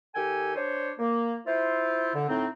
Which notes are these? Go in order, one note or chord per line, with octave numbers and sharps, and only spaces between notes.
D#3 G4 A4 G5 G#5
D4 C5 C#5
A#3
E4 F4 C5
D3
A2 C4 D#4